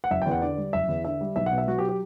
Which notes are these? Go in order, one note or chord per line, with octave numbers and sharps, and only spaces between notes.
F#5
F#1 E5
E2 G5
F#5
D3 D5
G3
F#1 E5
E2
D3 E5
G3
B1 E5
F#5
B2
E5
F#3 F#4
G4
G4